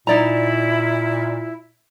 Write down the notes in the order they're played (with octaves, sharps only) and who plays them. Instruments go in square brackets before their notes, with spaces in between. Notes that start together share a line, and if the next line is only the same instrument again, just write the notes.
[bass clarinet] A#2 [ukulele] D#4 D5 A#5 [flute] E4